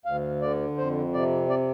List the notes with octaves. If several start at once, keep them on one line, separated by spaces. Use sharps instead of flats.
D2 F5
D3 D5
F2 C5
C3 D5
D5